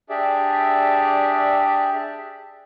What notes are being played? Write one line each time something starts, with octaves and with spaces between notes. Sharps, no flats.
D4 G4 G#4 D5 E5